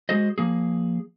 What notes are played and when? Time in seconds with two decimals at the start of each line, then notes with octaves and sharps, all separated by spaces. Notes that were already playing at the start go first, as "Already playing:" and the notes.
0.09 G#3 F#4 G#4 C5 D#5
0.38 F3 A#3 G#4